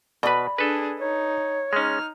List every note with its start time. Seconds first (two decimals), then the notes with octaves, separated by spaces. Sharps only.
0.23 B2 B4 D5 B5
0.58 D4 G#4 A4 B4
1.00 D#4 C#5
1.73 G#3 C#4 D#4 F6